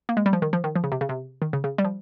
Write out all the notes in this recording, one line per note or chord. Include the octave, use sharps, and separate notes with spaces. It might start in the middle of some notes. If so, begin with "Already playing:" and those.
A#3
G#3
G3
F3
D#3
F3
D#3
F3
C#3
C3
C#3
C3
D#3
C#3
C#3
G3
F3